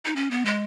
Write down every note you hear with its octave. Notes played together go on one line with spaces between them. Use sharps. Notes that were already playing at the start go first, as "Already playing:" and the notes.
D#4
C#4
B3
G#3